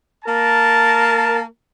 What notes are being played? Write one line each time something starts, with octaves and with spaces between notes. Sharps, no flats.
A#3 A#4 A5